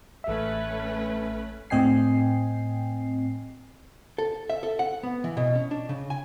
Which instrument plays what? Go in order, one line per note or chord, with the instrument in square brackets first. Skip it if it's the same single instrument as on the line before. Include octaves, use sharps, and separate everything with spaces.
[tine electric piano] A1 E5 [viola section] A3 C#4 B4
[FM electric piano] A2 C4 D#5 G5 G#5 C7
[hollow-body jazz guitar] A4
E5
A4
F#5
B3
E3
B2
C#4
D4
C#3
G#5